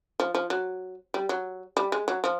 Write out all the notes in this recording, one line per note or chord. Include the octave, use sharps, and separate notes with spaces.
F3
F3
F#3
G3
F#3
G3
G#3
F#3
F3